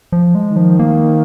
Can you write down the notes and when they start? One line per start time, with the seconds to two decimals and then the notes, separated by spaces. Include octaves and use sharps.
0.12 F3
0.35 G#3
0.50 D#3
0.56 F3
0.79 A#3